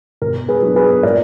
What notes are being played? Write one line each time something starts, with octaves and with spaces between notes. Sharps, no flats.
B2 A#4
G#4 B4
F#3 B3 D4
G#4 B4
A#2 A#4 D5